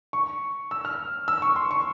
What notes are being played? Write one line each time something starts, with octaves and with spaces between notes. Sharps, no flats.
C#6
E6
F6
E6
C#6
C6
C#6